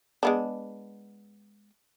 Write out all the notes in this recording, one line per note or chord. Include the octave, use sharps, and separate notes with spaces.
G#3 B3 D4